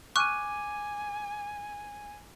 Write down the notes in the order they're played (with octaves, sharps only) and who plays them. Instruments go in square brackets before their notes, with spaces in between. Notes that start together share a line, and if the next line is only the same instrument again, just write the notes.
[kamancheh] G#5 [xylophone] C#6 F6 F#6 [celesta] D6 D#7